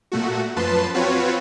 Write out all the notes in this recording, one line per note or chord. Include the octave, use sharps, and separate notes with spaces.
A#2 A3 F#4
F#2 F3 B4 A5 C6
C4 F4 F#4 B4 C#5